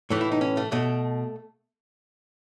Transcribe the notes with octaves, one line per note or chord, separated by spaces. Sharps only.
A2 E3 A3
E4
D#4
C#4
A3
B2 A3